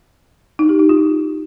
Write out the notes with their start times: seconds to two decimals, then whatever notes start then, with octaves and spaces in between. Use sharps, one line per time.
0.59 D#4
0.69 G4
0.79 D#4
0.89 F4